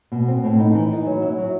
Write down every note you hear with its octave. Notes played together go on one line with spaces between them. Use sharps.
B2
C4
A2
D#4
E3
D#4
F#3
E4
F#3